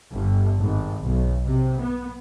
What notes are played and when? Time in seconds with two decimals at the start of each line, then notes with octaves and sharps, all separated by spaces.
0.13 G1
0.60 G#1
1.03 B1
1.45 C3
1.79 B3